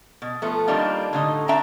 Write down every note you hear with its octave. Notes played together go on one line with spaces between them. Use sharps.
B2
F3 A3 B3
D#3 G3 A#3 D4 D#4 F4
A2 D3 D#4
D4 E5 G5 A5 A#5